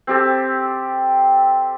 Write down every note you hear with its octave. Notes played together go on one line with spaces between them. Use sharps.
C4 G4 A4